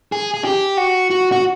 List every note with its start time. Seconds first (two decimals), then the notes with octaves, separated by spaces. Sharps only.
0.12 G#4
0.34 G#4
0.45 G4
0.77 F#4
1.11 F#4
1.32 F#4